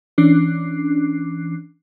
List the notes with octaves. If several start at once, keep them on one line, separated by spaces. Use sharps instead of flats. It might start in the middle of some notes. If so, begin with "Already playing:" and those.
E3 C#4 D4 D6 F#6 C7